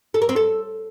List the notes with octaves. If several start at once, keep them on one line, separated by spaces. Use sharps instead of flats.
A4
A#4
C4
A4